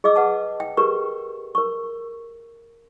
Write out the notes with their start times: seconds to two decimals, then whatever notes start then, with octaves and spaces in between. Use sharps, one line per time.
0.04 G#4 D#5 D6 E6
0.16 B4 F#5 A5
0.60 G5
0.77 G4 G#4 A#4 B4 A#5 C#6
1.55 A#4 C#6